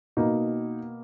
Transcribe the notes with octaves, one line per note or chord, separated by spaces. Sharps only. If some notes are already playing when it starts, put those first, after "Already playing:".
B2 A#3 D#4